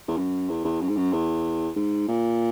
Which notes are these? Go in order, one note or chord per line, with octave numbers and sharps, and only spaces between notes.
E2
F#2
E2
E2
F#2
G#2
F#2
E2
G#2
A#2